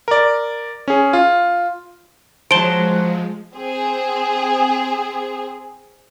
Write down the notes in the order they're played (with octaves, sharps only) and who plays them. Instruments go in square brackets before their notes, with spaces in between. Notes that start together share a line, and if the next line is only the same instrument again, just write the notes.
[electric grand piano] A#4 D5
C#4 G#4
F4
[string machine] F3 G#3 [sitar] F#3 C5 [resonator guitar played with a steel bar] A5 [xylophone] D7 G7
[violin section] C4 G#4